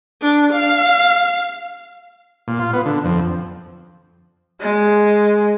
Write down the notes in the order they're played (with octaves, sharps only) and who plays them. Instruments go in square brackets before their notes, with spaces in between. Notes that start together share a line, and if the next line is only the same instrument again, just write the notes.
[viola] D4
F5
[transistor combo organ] A#2
F4
B3
D3
F2
[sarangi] G#3